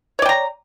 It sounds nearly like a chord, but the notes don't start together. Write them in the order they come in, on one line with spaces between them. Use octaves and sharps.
C#5 D5 G5 A#5